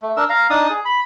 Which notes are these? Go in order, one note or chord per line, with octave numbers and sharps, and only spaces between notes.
A3
D4 A#4 E6
F5 A#5
D4 D#4 A5 D#6
G#4
B5